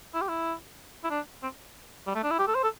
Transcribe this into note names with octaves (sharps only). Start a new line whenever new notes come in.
E4
G4
E4
E4
D4
C4
G3
A3
D4
E4
G4
A4
C5
A4